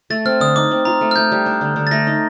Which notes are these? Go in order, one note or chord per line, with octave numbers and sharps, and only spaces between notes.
A3 A6
C4 F6
D3 D#6
D#4 D6
C4
F4 A#5
A3
F6
A3 G6
G3
D4
D3
D3
A6
A3 A#6
D#4